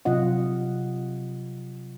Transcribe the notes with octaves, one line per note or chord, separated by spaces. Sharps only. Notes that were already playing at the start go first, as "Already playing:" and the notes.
C3 F#3 F4 D#5 F#5